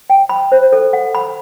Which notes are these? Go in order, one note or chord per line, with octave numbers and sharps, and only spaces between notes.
G5
B5
C5
A4
F#5
B5